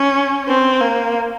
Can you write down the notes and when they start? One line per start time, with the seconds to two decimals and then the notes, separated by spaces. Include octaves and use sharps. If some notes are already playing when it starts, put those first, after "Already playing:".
Already playing: C#4
0.48 C4
0.81 A#3